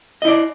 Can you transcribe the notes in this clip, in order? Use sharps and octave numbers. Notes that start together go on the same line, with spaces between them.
E4 D5 D#5